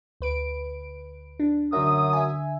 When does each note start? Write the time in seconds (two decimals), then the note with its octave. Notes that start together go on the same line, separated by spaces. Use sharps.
0.21 D2 B4 D7
1.40 D4
1.73 F#2 D3 F#3 E5 D#6
2.13 E5 G#5